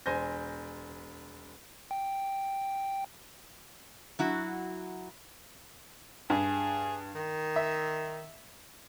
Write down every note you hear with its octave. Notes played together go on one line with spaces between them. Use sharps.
E1 C5 G#5 G6 A#6
G5
F#3 E4 F#4
G2 G#4
D#3
E5